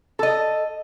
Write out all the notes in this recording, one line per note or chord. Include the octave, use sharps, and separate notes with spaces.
A4 D#5